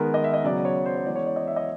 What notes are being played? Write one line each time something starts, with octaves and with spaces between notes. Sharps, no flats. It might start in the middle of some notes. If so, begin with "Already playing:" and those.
Already playing: D#3 G#3 B3 A#4
D#5
E5
D#5
C#3 F#3 B3 D5
C#5
C5
C#5
E3 G#3 B3 D5
C#5
D5
D#5
E5
D#5